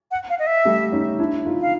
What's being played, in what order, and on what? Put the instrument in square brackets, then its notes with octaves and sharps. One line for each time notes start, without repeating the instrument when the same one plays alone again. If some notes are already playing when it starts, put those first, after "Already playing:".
[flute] F#5
F5
D#5
E5
[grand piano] G3 A3
C#4 D#4
D4 E4
D#4 F4
[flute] F5